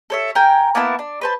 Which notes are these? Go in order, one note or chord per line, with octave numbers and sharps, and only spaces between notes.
A4 C#5 E5
A#4 G5 G#5
A#3 B3 E4 A5
D4
B4 C5 A5